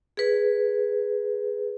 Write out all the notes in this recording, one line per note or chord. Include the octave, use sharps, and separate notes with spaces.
G#4 B4